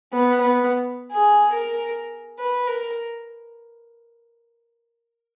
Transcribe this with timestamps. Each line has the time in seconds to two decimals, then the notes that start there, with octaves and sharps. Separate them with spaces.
0.13 B3
0.41 B3
1.12 G#4
1.54 A#4
2.39 B4
2.68 A#4